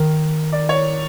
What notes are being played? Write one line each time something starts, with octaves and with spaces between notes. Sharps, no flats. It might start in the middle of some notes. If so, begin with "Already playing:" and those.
Already playing: D#3 A#4
D5
C#5